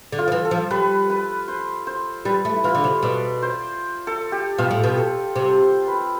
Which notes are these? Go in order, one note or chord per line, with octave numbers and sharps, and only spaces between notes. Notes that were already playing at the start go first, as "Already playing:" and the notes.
D3
F4
F3
E3
A4
F3
G3 B4
B4
C5
C5
G3 B4
A3
E4
E3 F4
D3
C3
B2 D5
C5
A4
G4
B2 F4
A2
B2
A4
C3 C5
C5
B4